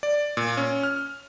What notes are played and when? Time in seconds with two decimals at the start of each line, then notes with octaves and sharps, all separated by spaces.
0.03 D5
0.37 A#2
0.57 C#4
0.83 F6